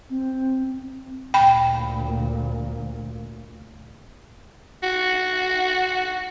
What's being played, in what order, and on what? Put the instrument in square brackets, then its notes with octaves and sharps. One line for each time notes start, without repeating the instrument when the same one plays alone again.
[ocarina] C4
[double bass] D2 A#2 [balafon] G5 B5
[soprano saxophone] F#4